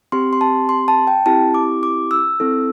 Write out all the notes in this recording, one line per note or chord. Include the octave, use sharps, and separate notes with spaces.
C4 G4 C6
C6
A5
C6
A5
G5
C4 E4 G4 A5
D6
D6
E6
C4 E4 A4